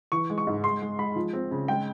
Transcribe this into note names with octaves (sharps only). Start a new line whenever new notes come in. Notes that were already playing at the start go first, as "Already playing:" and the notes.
E3 C#6
G#3
C#6
G#2
G#3 C6
G#3
G#3 B5
F3
C4
C#3
G#3 G5